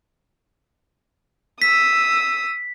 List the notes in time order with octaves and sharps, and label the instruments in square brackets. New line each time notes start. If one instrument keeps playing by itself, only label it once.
[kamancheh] D#6 E6 [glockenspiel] B6